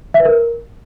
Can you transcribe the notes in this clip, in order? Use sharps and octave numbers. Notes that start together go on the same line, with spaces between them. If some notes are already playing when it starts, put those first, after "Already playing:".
E5
B4
A#4